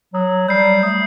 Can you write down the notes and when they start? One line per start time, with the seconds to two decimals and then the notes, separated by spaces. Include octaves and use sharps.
0.14 F#3 D#6
0.48 G3 G6 C7
0.83 A3 D#6